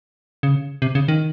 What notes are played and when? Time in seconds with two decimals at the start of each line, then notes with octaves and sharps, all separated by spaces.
0.43 C#3
0.82 C3
0.95 C#3
1.08 D#3